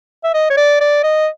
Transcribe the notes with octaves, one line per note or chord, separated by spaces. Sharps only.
E5
D#5
C#5
D5
D5
D#5